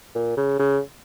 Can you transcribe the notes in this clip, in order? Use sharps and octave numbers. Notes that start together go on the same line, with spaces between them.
A#2
C#3
C#3